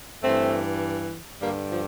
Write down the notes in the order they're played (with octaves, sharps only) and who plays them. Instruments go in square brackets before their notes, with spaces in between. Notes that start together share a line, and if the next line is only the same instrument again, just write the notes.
[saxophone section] G2 E3 A3 C4
G2 D3 G3 A#3
F3